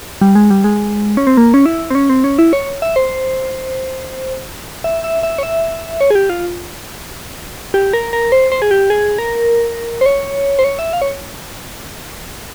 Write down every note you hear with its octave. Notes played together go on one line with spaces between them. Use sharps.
G3
G#3
G3
G#3
C#4
C4
A#3
C#4
E4
C4
C#4
C4
C#4
E4
C#5
E5
C5
E5
E5
E5
C#5
E5
C#5
G#4
G4
F4
G4
A#4
A#4
C5
C5
G#4
G4
G#4
A#4
C5
C#5
C5
C#5
E5
F5
C#5